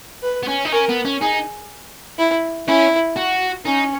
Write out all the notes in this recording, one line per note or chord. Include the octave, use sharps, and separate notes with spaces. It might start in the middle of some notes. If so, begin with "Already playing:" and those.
B4
B3
C#4
D#4
C#4 A#4
B3
C#4
D#4 G#4
E4
C#4 E4
F#4
C#4 D#4